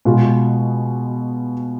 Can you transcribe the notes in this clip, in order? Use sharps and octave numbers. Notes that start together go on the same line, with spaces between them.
B2 G#3 F4